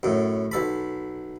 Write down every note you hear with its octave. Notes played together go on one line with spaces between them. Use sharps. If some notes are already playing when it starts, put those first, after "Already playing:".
F#2 A2
B1 A4 B5